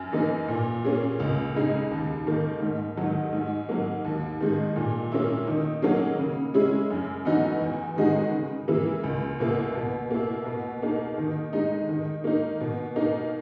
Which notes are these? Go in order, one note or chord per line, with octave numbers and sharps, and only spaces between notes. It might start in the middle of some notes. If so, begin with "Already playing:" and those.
Already playing: F#2
E3 A#3 D#4
A#2
A#3 C#4 G#4
C#2
C#3 G#3 D#4 G#4
D#2
D#3 A#3
G#2
D#3 F#3
G#2
F#3 A#3
D#2
D#3 G#3
A#2
A#3 C#4 E4
D#3
F#3 A#3 C#4 G#4
C#3
G#3 C#4 E4 G#4
F#2
E3 B3 D#4 F#4
E2
D#3 G#3 D#4 F#4
C#3
E3 A#3 E4 G#4
C#2
B2 A#3 E4
B2
A#3 E4
B2
A#3 D#4 G#4
D#3
G#3 D#4
D#3
A#3 D#4
B2
A#3 D#4